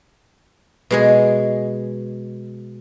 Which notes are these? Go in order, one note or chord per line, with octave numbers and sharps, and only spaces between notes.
B2 G#3 G#4